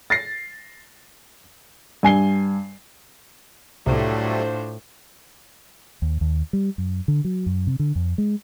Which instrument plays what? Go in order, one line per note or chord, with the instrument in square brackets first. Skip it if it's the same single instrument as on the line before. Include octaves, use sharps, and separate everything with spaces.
[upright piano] A6 A#6 C7
G2 G#5 C7 G7
[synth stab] C2 [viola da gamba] A2 [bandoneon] F#3 G3 A3 [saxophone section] D4 F4 C5
[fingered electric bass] D#2
D#2
G3
F#2
D3
F#3
F#2
C3
D3
F2
G#3